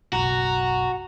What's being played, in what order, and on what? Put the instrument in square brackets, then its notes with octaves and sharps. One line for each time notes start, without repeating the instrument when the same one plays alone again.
[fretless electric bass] F#1 B1 [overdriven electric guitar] F#4 [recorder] A#5